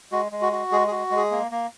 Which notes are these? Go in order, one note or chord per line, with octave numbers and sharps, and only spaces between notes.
G#3 F#4
G#3
F#4
F#4
G#3 G#4
G#4
F#4
G#3
G#4
A#3
A#3